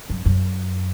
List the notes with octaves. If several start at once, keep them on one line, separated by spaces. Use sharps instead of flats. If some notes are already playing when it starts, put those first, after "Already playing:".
F#2
F#2